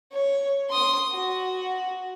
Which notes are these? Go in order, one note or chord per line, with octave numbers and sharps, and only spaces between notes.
C#5
C6 D#6
F#4